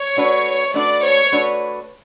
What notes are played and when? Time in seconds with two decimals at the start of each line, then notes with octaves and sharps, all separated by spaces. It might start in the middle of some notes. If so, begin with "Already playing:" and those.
Already playing: C#5
0.17 A3 D4 F#4 B4
0.74 A3 D4 F#4 B4 D5
1.04 C#5
1.32 A3 D4 F#4 B4